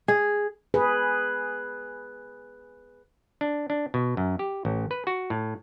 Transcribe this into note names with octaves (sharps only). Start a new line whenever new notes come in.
G#4
G#4 B4
D4
D4
B2
F#2
G4
A1
B4
F#4
A2